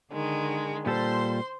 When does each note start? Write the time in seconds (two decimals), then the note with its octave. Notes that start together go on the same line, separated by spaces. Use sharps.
0.12 D3 D#3 G#3
0.86 A#2 G3 A4 C5 C6